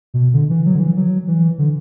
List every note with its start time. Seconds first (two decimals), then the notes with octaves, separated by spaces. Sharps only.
0.14 B2
0.34 D3
0.50 E3
0.66 F#3
0.75 D3
0.80 E3
0.96 F#3
1.28 E3
1.58 D3